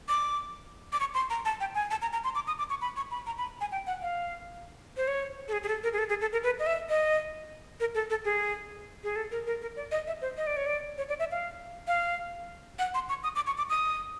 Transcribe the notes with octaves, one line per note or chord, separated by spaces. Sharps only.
D6
D6
C#6
C6
A#5
A5
G5
G#5
A5
A#5
A#5
C6
D6
D#6
D6
C#6
B5
C#6
B5
A#5
B5
G#5
G5
F#5
F5
C5
C#5
A4
G#4
G#4
A4
A#4
G#4
A4
G#4
A4
A#4
B4
D#5
E5
D#5
A#4
A4
A4
G#4
G#4
A4
A#4
A#4
A#4
D5
D#5
E5
C5
D#5
D5
C#5
D5
C#5
D5
E5
F5
F5
F#5
C6
C#6
D#6
D6
C#6
D6
D#6